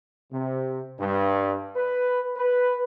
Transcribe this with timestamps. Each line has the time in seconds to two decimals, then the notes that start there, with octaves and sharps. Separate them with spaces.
0.33 C3
1.00 G2
1.76 B4
2.36 B4